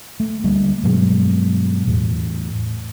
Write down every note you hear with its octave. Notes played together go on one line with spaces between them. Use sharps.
A3
D2 G3 A3 A#3
G2 B2 F#3 G#3
E2 A2